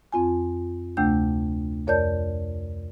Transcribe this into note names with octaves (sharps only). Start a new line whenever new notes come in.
F2 C4 F4 G#5
D2 C3 A3 D4 G5 G6
F2 A#4 C#5 D5 A5 G6